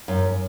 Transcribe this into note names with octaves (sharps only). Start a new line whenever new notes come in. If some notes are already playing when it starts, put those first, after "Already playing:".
F#2